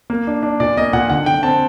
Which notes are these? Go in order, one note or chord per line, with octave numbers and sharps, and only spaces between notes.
A#3
D4
D4
A#2 D5
A#3 D#5
A#2 F#5
D3 F#5
D3 G5
C4 A5